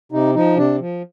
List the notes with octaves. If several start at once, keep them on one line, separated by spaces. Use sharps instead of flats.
C3 D#4
F3 D#4
C3 D4
F3